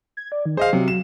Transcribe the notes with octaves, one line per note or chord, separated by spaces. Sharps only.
G#6
D5
D#3
G#4 C5 D#5 F5
C3 F#3
E7